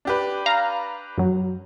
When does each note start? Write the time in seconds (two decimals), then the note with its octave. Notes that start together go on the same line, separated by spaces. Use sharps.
0.05 D4 G4 B4
0.46 F5 A#5
1.18 F#2 F#3